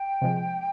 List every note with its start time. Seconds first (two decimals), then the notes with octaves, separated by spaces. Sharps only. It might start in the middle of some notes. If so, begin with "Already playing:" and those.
Already playing: G5
0.21 C3 F3 G#3